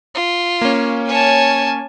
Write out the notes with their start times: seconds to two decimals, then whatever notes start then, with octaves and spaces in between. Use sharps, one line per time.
0.15 F4
0.61 A#3 C#4
1.08 C#5 G#5 A5